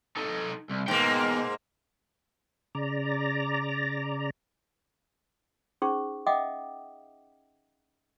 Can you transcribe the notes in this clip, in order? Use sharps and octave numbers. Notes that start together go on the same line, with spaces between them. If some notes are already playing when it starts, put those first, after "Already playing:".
D#4 A4
C2
G#2 B2 A#3 G5
C#3 D5 A#5
C#4 D#4 G#4 C5 C#6
D#5 E5 F#5 G5 D6 D#6